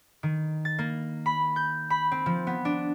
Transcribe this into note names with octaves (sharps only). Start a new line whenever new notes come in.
D#3
A6
A#3
B5
G6
B5
C4
F3
B3
D4